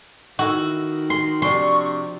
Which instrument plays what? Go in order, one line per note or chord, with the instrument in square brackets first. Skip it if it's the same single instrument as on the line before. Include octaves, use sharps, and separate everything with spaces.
[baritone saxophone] D#3 [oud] E4 A4 [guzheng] F#4
[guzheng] C6
[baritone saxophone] C3 [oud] F3 D4 [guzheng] C6 [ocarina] C#6